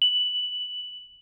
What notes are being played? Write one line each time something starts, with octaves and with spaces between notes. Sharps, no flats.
F#7